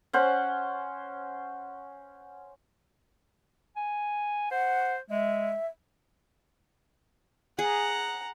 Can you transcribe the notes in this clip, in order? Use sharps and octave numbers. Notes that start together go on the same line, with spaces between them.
C#4 C5 F#5
G#5
C5 F#5
G#3 E5
G#4 F#5 A#5